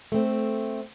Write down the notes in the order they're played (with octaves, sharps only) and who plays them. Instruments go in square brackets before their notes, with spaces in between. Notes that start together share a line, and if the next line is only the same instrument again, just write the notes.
[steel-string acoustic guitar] A3 C4